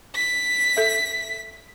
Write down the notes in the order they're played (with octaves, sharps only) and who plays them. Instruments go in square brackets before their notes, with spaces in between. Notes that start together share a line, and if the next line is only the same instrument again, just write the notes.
[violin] B6
[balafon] A4 E5